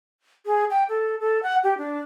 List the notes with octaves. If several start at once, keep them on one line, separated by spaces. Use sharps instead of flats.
G#4
G5
A4
A4
F#5
G4
D4